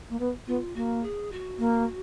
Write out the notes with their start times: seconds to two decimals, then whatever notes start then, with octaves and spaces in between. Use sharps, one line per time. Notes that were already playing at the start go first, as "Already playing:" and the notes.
0.10 A#3
0.20 B3
0.47 B3 F4
0.75 A#3 F#4
1.03 G#4
1.32 F#4
1.59 A#3